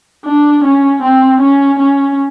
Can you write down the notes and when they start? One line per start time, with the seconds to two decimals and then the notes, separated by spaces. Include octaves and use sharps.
0.25 D4
0.64 C#4
1.02 C4
1.40 C#4
1.79 C#4